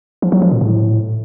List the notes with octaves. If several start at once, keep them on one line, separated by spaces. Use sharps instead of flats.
F3
F#3
F3
A#2
A2